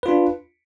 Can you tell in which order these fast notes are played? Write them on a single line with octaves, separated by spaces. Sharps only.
B4 F4 D4